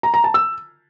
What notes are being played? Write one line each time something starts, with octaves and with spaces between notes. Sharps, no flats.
A#5
A#5
A5
E6